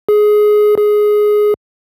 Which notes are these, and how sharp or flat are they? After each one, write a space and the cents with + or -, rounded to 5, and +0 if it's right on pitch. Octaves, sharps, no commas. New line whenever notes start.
G#4 +15
G#4 +10